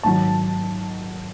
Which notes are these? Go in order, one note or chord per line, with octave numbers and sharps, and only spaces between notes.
G#2 D#3 F#3 A5